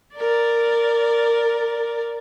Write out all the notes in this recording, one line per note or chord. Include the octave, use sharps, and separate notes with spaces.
A#4 D5